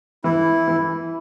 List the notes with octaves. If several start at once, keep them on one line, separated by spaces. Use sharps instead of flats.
E3 E4
E3